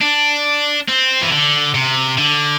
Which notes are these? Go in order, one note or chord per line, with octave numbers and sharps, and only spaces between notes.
D4
C4
E3
D3
C3
D3